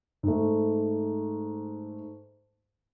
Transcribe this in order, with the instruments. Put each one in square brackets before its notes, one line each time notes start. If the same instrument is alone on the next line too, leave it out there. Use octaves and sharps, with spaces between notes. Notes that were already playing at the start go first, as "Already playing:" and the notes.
[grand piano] G#2 A3